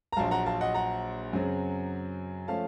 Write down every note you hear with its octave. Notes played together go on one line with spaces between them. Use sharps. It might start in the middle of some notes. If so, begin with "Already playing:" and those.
A#5
A#1 A#2 F#3 F5 A5
F#5 A#5
F5 A5
D#5 F#5
F#5 A#5
F#2 C#3 F#3 C4
F3 A3 C#4 F5 A5